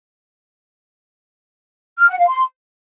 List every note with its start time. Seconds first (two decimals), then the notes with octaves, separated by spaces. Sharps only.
1.99 F6
2.09 F#5
2.18 F5
2.28 C6